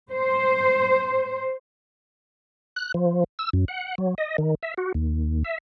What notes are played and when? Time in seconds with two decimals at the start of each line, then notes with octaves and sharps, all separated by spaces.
0.11 C5
2.76 F#6
2.94 F3
3.39 E6
3.53 F#2
3.68 F#5
3.98 F#3
4.18 D#5
4.38 D#3
4.63 E5
4.78 F#4
4.94 D#2
5.45 E5